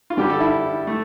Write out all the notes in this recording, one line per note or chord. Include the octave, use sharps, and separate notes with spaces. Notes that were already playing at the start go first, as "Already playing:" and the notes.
F4
G2 D3 G3 G4
A4
E4
A3